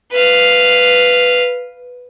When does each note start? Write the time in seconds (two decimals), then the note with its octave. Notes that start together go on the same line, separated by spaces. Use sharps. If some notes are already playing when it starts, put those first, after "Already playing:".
0.12 B4 F5